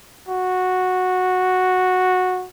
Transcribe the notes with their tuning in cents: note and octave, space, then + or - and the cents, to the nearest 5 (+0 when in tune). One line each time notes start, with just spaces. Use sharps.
F#4 -10